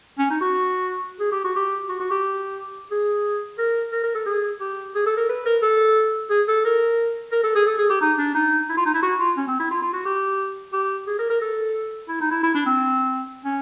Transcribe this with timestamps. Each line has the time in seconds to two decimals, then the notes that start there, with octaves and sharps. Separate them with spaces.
0.19 C#4
0.30 D#4
0.41 F#4
1.20 G#4
1.32 G4
1.44 F#4
1.56 G4
1.89 F#4
2.00 F#4
2.11 G4
2.91 G#4
3.58 A#4
3.92 A#4
4.03 A#4
4.15 A4
4.26 G#4
4.60 G4
4.95 G#4
5.06 A4
5.17 A#4
5.29 B4
5.46 A#4
5.62 A4
6.30 G#4
6.48 A4
6.65 A#4
7.32 A#4
7.43 A4
7.55 G#4
7.66 A4
7.78 G#4
7.90 G4
8.01 D#4
8.18 D4
8.35 D#4
8.69 E4
8.77 F4
8.86 D#4
8.94 E4
9.02 F#4
9.19 F4
9.37 C#4
9.48 C4
9.60 E4
9.71 F4
9.82 F4
9.93 F#4
10.05 G4
10.73 G4
11.07 G#4
11.19 A#4
11.30 A#4
11.41 A4
12.09 E4
12.20 D#4
12.31 E4
12.43 E4
12.55 D4
12.66 C4
13.44 C#4